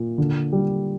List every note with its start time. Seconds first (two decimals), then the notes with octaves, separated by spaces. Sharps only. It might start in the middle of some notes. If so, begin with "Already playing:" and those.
Already playing: A#2
0.18 D3
0.53 G3